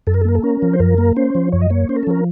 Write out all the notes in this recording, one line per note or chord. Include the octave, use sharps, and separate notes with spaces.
F#2 A4
A#4
A4
A#3 A#4
A4
C#4 A#4
F3
C5
F#2 A#4
A#3
C#4 C5
F3
F#2 C#5
D#5
A#3 C#5
C#4 C5
A#4
A4
F3 A#4